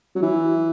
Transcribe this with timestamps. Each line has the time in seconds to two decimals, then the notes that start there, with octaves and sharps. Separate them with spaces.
0.15 F#3
0.22 E3